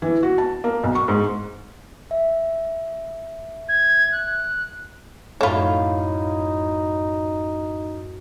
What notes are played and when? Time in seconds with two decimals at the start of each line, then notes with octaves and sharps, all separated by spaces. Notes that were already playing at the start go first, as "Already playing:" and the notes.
0.02 E3
0.23 F#4
0.38 A5
0.64 A#3
0.84 B1
0.95 C#6
1.08 G#2
2.11 E5
3.69 G#6
4.12 F#6
5.41 F#2 A2 A3 D#4 F4 C#5 F5 B5